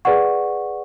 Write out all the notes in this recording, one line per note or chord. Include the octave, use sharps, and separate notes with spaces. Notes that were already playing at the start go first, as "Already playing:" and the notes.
G#4 B4 D5 F#5 C#6